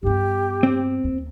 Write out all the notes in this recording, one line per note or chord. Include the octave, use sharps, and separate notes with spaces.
G2 B3 G4
C4
D#2